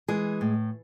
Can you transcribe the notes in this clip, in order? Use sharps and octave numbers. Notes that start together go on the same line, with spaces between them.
E3 G#3 G#4
A2